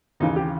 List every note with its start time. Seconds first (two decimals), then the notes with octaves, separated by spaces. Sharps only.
0.20 D#2 C#3 E3 D#4
0.36 G4